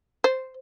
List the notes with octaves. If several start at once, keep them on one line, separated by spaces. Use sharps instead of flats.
C5